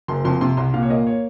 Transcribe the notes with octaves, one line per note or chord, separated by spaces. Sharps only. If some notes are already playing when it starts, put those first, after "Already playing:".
F#1 C6
F2 C6
C3 C6
C2 C6
A#2 F5
C#5
A#3 D#5
C#5